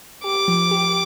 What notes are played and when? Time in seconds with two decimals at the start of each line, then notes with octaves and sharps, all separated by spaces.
0.24 G4 D6
0.48 F3
0.71 G4